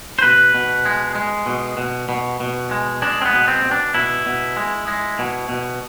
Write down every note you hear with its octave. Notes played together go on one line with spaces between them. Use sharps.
C5
B2 B4
B2
G#3
G#3
B2
B2
B2
B2
G#3
G#3 D4
C4
B3
B2
C4
B2
D4
B2 E4
B2
G#3
G#3
B2
B2